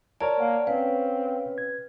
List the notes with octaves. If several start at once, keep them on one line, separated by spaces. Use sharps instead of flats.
A#4 C#5 D5 A5
A#3 F#5
C4 C#4 B4 C#5 F5
G#6